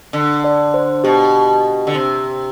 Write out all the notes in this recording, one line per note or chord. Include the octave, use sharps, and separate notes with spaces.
D3
D5
C5
B2 G4
D3
C3